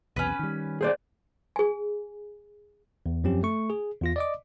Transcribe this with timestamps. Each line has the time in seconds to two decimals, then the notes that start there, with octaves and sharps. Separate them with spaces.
0.16 B1 E2 C3 C#4 B4
0.39 D#3 G3
0.81 G#4 C5 D5
1.56 G#4 G#5
3.06 E2
3.24 F#2 F3 C4 C#4 G4
3.43 A3 C#6
3.70 G#4
4.01 E2 F4 A#6
4.16 D5 D#5 D6